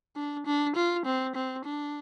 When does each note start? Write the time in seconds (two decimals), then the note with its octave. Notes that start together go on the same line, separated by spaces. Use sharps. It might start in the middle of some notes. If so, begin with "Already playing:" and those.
0.16 D4
0.46 D4
0.76 F4
1.06 C4
1.35 C4
1.66 D4